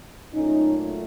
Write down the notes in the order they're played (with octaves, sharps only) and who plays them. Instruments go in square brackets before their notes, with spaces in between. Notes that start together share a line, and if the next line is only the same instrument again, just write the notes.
[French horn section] A#2 F#3 A3 C#4 D#4